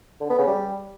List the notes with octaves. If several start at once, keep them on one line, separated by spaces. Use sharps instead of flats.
D3
B3
C#3
G3